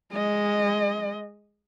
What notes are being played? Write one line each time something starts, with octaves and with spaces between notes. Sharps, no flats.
G#3 D#5